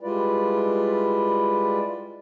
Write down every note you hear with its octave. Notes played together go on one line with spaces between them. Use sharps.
G3 G#3 E4 F4 B4 D5